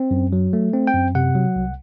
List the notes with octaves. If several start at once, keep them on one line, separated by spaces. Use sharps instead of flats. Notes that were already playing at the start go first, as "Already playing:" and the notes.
Already playing: C4
F#2
F#3
A3
C4
G5
F#2
C3 F#5
F#3
C2